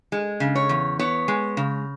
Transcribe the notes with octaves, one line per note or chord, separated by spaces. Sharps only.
G#3
C#3
C#5
E2
B3 C#5
G#3
C#3